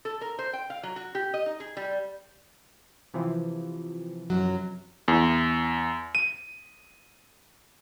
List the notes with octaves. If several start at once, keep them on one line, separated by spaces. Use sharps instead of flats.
A4
A#4
C5
G5
F5
F#3
F#4
G4
D#5
D#4
G#4
G3
C3 E3 F3
F#2 F#3
E2
D#7